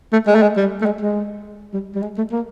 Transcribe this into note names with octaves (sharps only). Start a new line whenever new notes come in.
A3
G#3
A3
G#3
G3
A3
G#3
G#3
G3
G3
G#3
A3
A#3